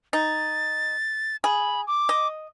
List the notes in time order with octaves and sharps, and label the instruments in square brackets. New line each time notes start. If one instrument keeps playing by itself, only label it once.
[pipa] D#4 [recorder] A6
[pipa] G#4 [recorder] B5
[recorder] D6
[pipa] D#5